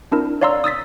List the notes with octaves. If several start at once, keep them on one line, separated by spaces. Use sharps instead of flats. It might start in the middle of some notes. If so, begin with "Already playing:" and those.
C4 D4 E4 A#4
C#5 D5 F5 A#5 C6 E6
D#6 E6 A6 B6